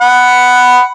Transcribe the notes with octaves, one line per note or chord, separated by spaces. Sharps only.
F#5 B5